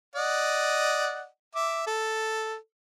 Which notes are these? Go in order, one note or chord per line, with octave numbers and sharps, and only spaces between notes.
D5 D#5 F#5
E5 D6
A4